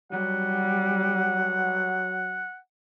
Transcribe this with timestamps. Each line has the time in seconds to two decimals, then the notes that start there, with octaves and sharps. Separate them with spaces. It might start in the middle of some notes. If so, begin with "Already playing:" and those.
0.12 F#3 G3 F#5